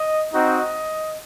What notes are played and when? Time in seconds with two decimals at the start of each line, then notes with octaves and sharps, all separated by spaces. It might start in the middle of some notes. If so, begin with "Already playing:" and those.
Already playing: D#5
0.31 C4 D#4 F#4 D#5